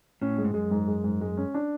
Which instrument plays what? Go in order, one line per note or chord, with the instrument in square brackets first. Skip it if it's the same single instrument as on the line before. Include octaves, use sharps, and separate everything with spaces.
[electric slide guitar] A2 [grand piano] C#4
[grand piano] G#3
[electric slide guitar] G#2
[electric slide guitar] F#2 [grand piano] G#3
[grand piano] G#2
G#3
G#2
G#3
C#4
D4